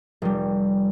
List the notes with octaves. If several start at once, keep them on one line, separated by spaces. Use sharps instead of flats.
F1 G3